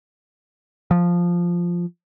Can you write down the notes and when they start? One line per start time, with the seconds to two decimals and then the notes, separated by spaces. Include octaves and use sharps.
0.91 F3